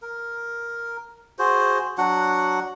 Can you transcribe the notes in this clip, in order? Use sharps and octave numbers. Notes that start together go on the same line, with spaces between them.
A#4
F#4 G#4 C5
F#3 D4 F#4 F#5